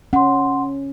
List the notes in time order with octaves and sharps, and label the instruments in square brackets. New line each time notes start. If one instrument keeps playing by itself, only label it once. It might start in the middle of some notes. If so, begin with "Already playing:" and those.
[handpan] C#4 [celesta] F#5 C6